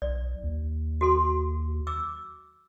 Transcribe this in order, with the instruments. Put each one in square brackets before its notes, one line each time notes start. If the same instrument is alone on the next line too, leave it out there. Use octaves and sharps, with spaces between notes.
[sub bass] B1 [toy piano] D5
[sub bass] D#2
[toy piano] F#4 A4 C6
D6 E6